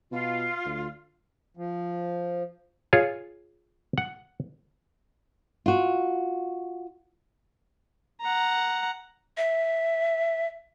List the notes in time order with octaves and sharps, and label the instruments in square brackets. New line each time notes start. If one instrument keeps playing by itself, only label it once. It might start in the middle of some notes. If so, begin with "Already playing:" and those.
[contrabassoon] B2 [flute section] F4
[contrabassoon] D2
[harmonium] F3
[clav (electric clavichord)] F4 G#4 C#5
F#5
[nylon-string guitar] F4 F#4
[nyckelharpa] F#5 A#5
[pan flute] E5